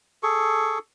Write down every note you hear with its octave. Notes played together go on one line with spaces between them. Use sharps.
G#4 A4 C#6